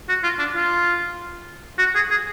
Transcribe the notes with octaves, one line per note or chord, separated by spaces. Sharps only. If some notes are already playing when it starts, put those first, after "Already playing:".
F#4
F4
D4
F4
F#4
G#4
G#4